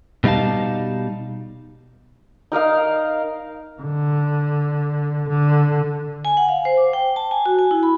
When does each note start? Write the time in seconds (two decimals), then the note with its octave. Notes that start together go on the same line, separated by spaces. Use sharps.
0.24 B2 G3 D#4 F5 A5
2.52 D#4 A#4 D#5 F5
3.82 D3
5.29 D3
6.25 G#5
6.37 F#5
6.49 F5
6.65 C5
6.77 D6
6.93 G5
7.16 A5
7.31 G#5
7.46 F#4
7.59 G#5
7.71 E4
7.83 B5